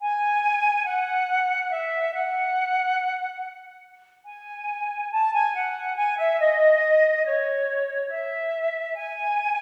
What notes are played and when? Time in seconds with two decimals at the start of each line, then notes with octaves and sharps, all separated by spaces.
0.01 G#5
0.86 F#5
1.71 E5
2.14 F#5
4.26 G#5
5.12 A5
5.33 G#5
5.54 F#5
5.97 G#5
6.18 E5
6.40 D#5
7.25 C#5
8.10 E5
8.95 G#5